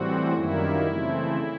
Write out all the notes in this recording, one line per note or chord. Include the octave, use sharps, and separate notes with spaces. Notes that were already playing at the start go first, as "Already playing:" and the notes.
Already playing: A2 E3 G3 C4 F#4
F#2 D#3 G3 A#3 E4
C#3 E3 A3 C4